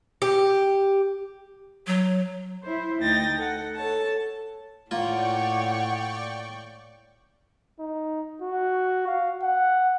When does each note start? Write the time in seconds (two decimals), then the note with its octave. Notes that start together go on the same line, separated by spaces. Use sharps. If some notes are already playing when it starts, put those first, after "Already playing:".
0.22 G4
1.87 F#3
2.64 E4 C5
3.02 D2 D#4 G5 A6 A#6
3.38 A4 F#5
3.76 A4 C#5 A5
4.91 A2 A#3 F4 C#5 D5 F#5 G5 C#6
7.79 D#4
8.42 F#4
9.07 F5
9.42 F#5